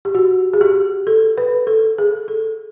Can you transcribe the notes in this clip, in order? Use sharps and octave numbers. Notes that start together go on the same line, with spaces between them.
G4
F#4
G#4
G4
A4
B4
A4
G#4
A4